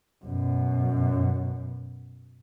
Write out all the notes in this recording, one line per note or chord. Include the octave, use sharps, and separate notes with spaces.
F#2 B2